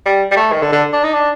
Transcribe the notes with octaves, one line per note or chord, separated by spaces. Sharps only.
G3
G3
A3
D#3
D3
D3
D4
D#4
D4